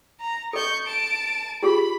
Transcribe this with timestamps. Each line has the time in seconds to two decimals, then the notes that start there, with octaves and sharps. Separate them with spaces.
0.20 A#5
0.53 A4 D#5 C#6 G6
0.87 A5 D7
1.62 F4 G4 G#4 B5